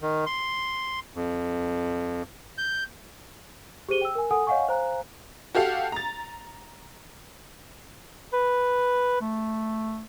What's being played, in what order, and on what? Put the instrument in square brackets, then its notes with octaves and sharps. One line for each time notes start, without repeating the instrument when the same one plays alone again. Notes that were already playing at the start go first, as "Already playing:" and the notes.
[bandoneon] D#3
C6
F2
G6
[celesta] G4 G#4 C5 D#7 G7
G5 E6
A#4 G#5
A4 F#5 G#5 D#6
C#5 D#5 F5 F#5 G#5 C#6
C5 F5 G#5 A#5 F#6
[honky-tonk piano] F#4 G4 A4 F5 F#5
A#5 A6
[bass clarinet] B4
A3